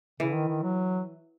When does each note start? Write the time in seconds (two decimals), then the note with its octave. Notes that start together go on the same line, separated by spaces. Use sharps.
0.20 C#3 E3
0.34 D#3
0.48 D#3
0.63 F#3